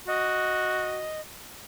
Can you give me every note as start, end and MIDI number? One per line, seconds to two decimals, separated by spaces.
0.08 1.10 66
0.08 1.21 75